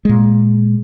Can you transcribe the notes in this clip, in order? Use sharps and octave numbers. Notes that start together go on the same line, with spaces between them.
A#2 G#3